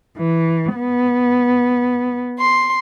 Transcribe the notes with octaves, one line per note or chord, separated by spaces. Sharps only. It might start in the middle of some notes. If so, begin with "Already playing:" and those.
E3
B3
C6